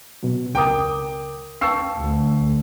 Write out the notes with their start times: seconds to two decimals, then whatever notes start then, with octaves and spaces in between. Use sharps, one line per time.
0.23 B2 F#3
0.55 C#2 A#4 G5 D6 D#6
1.61 F5 G5 A5 C#6 E6 C7
1.98 D2